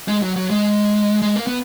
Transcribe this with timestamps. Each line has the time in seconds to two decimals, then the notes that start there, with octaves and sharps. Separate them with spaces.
0.08 G#3
0.22 F#3
0.36 F#3
0.50 G#3
1.22 G#3
1.36 A#3
1.47 B3